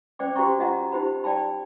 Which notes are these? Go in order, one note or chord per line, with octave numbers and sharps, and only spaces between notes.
C#4 C5 D5 G5 D6
F#4 G4 C5 G5 A#5 C#6
F4 D#5 F#5 A#5
D#4 G4 C5 B5
D5 G5 A5 B5